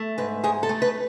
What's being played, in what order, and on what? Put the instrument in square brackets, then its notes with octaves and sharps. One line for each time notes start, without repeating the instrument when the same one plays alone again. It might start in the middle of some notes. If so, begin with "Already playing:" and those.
Already playing: [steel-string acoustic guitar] A3
G#2 B4
G#2 G#4
A4
A3
B4